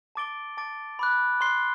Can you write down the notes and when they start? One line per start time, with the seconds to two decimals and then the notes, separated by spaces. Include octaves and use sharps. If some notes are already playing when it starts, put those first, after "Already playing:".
0.15 A5 D6 A6 D7 G7
0.57 A5 D6 A6 D7
0.99 B5 D6 F#6
1.41 C6 F#6 C7 G7